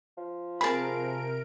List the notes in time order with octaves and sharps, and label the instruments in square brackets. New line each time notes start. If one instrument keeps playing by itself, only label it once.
[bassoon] F3
[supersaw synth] C3 A#4 D7 [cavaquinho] G#4 A5 [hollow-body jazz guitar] B5